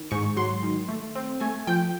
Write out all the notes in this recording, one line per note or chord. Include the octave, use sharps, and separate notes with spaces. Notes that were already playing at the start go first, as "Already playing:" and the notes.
Already playing: D#3
G#2 C#6
F#3 C6
D#3
A3
C4
A3 G#5
F3 G5